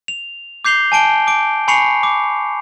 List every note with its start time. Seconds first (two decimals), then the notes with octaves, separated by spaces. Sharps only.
0.08 F7
0.65 D6 G6 C7 F7 G7
0.92 G#5 A5 D7 G7
1.27 D6 D7
1.68 G#5 B5 C#6 C7 C#7 F7
2.03 D6